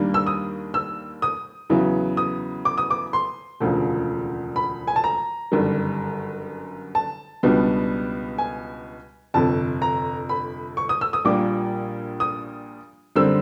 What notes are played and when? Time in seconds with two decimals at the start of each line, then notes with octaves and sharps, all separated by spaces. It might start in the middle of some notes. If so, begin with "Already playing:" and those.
Already playing: D#2 D#3 G3 A#3 D4
0.14 E6
0.27 D#6
0.74 E6
1.22 D#6
1.70 E2 C#3 F#3 B3 E4
2.17 D#6
2.65 D6
2.78 D#6
2.90 D6
3.13 C6
3.60 E1 D2 C#3 F3
4.56 B5
4.87 G#5
4.96 A5
5.04 A#5
5.52 G1 F#2 D#3 G3
6.95 A5
7.43 C#2 B2 G3 B3 D4
8.38 G#5
9.34 G1 F2 C3 A5
9.82 A#5
10.29 B5
10.77 C#6
10.89 D#6
11.01 E6
11.13 D#6
11.25 A#1 A#2 G3 A#3 D6
12.20 D#6
13.16 F#2 D3 G3 C4 E6